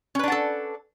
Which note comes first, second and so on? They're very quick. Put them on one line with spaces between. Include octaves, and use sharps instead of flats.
C#4 B4 D4 F#5 A4